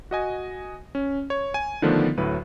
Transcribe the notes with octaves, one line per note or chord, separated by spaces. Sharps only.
F#4 D#5 G#5
C#4
C#5
G#5
D3 D#3 F3 A3 B3 D4
D2 A2 F#3 B4